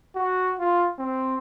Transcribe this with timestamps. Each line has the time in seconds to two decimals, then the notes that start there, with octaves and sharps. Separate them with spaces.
0.16 F#4
0.59 F4
0.99 C4